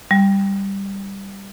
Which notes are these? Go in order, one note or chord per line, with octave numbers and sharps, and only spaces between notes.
G3